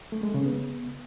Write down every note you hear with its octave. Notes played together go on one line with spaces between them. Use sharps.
A3
G#3
C#3
B3